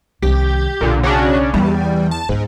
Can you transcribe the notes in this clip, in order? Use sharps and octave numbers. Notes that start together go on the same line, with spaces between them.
C2 D#3 G4
B1 A#2 D3
C#3 C#4 D4 F#4
E2 E3 G3
A5
C#2 G#2 B3